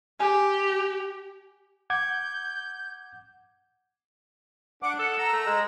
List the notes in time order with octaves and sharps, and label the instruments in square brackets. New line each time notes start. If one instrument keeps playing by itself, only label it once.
[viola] G4 [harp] G#5
[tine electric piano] F#5 D6 G#6 [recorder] G6
[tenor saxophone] D4 [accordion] F#5 D6
[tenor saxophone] A4 [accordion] F#5
[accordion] A#5 E6
[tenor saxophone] A3
G#3